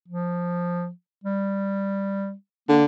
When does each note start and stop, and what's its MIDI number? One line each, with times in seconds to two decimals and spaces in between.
0.08 0.90 53
1.24 2.33 55
2.69 2.85 50
2.69 2.82 58